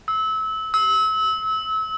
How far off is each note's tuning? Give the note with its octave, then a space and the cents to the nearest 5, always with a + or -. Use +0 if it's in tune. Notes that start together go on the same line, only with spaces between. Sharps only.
E6 -25
E6 -30